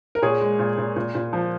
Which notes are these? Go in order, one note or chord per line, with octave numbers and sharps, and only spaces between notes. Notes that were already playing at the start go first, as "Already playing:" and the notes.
A#4
A#2 G#4 C#5
G#3
A#2
A#2
A#2
A#2
F3